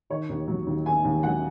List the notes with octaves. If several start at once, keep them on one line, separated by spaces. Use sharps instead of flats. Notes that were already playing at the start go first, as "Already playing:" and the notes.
D#3 C#5
D#2
F#3
D#2
D#3 G#5
D#2
F#3 F#5